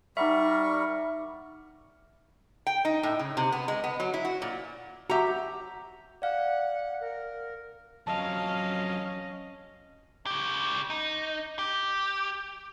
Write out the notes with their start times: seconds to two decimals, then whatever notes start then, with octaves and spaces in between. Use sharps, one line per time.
0.17 G3 D#4 A#4 E5 F#5 B5 C#6
2.67 G5
2.85 D#4
3.03 A2
3.19 C#3
3.37 C3
3.52 B3
3.68 G#3
3.84 B3
4.00 F#3
4.14 E4
4.25 F#4
4.42 A#2
5.10 F#4 G4 E5 A#5
6.22 D5 F5 F#5
7.01 A#4
8.07 F2 F#3 C#4 D#5 F5 A5
10.26 C#3 G4
10.90 D#4
11.59 G4